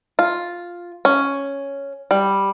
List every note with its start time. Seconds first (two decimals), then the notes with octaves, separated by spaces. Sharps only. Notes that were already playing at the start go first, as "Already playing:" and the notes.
0.19 F4
1.05 C#4
2.11 G3